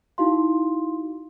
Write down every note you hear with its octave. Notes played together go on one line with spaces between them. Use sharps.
D#4 E4 F#4 F5 C6